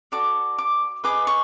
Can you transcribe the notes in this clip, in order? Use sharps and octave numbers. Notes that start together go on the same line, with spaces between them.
F#4 A4 D5 D6
D6
G#4 B4 D#5 D6
C#6